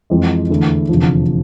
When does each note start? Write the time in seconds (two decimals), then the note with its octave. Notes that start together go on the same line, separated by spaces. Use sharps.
0.10 F2 E3 G#3 C4
0.50 E2 D3 A3 E4
0.89 F1 E2 D3 F3